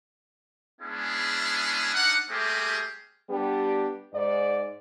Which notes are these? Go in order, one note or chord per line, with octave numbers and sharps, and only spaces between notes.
G#3 B3 C#4 D4 E4 G#4
D4 D#4 F5 F#5
G3 A3 A#3 C4 G4 G#4
G3 B3 D4 G4
G#2 D5